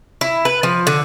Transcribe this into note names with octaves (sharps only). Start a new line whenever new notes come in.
E4
B4
F3
D3